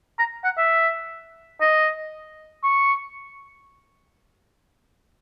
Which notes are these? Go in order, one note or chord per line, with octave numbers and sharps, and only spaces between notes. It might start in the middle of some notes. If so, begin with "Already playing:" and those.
A#5
F#5
E5
D#5
C#6